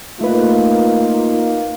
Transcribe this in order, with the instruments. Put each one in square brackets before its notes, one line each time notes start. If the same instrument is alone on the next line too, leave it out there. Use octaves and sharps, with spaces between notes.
[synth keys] A3 B4 [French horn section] A#3 D#4 F4